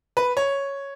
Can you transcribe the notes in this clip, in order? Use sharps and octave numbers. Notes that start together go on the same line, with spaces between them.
B4
C#5